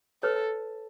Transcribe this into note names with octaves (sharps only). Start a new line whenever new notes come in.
A4 B4 C#5